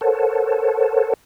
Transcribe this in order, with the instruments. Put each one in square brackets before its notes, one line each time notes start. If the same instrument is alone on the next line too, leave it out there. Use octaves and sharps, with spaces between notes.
[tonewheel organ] A4 A#4 C5 C#5 F#5 A5